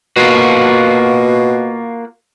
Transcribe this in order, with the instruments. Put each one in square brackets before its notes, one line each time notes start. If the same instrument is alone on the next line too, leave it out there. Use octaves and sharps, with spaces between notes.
[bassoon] B2 [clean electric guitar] A#3 F4 F#4